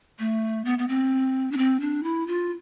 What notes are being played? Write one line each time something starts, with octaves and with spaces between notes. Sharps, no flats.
A3
B3
B3
C4
D4
C4
D4
E4
F4